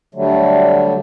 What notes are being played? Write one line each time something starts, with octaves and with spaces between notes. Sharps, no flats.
D3 F#3 G3 A3